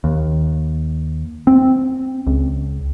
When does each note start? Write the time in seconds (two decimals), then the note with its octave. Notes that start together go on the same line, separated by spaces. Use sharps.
0.04 D#2
1.47 C4
2.27 C#2